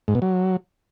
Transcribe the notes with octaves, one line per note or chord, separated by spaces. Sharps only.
G#2
B2
F#3